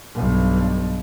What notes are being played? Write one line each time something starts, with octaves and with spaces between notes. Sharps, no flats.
B1 G2